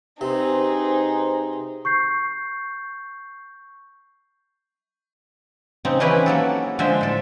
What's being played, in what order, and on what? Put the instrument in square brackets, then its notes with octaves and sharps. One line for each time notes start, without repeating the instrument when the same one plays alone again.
[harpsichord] C3 [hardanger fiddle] D#4 G#4 [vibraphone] B4 C5 C6
[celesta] C#6 G6 C7
[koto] C#3 C4 D#4
D#3 E3 C#4 E4 G4 B4
F#3 A#3 A4
D3 F3 G#3 C5 E5
A2 A4